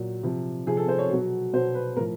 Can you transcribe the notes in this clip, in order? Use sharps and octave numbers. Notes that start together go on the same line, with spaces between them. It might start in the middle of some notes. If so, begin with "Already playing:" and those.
Already playing: A#2 F#3
C3 F3
C3 F3 G#4
A4
C5
C#5
B2 F#3
B2 F#3 C5
B4
A2 F3 A#4